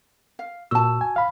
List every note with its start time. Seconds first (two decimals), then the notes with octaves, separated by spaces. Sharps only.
0.39 F5
0.71 A#2 F#4 A5 E6
1.01 G#5
1.16 F5 B5